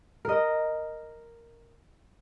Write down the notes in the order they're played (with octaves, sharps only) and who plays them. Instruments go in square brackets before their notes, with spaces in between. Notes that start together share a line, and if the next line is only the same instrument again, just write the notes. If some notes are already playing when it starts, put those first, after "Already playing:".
[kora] A#4 D#5